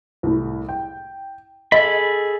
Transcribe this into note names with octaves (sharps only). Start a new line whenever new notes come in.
C2 A2
G5
G#4 A4 D#5 B5